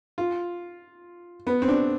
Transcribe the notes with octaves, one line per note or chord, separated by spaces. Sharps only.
F4
B3
C4
D4